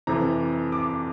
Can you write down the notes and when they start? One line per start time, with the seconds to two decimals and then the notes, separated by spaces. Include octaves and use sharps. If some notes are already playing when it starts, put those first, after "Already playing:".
0.07 F2 C3 E3 A#5
0.72 D6